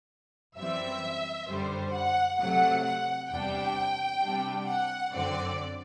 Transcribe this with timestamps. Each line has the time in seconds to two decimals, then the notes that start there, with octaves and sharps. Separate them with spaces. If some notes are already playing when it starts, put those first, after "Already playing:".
0.57 F#2 E3 G3 C4 E5
1.48 F#2 D3 G3 C5
1.94 F#5
2.39 C3 F#3 A3 F#5
2.85 F#5
3.31 E2 C3 G3 D4 G5
4.22 C3 G3 D4
4.67 F#5
5.13 F#2 D3 F#3 C4 D5